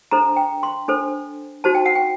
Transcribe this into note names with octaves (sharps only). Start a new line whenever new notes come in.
D4 A4 C5 A#5
G5
C6
D4 A4 C5
D#4 F#4 C5 A5
G5
F#5
G5